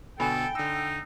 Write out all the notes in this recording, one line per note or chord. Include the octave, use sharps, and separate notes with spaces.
B2 D3 B3 A4 G5 G#5 B5
D3 D#4 E6